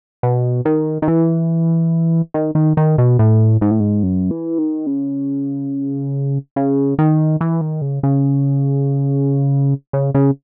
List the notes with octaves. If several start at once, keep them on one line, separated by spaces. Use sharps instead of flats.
B2
D#3
D#3
E3
D#3
D#3
D#3
B2
A2
G#2
A2
G#2
F#2
E3
D#3
C#3
C#3
D#3
E3
D#3
C#3
C#3
C#3
C#3